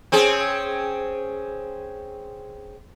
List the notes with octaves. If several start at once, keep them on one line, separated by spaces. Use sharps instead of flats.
C4 C#4 G#4